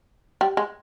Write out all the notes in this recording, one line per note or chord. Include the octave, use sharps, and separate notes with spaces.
G3
G#3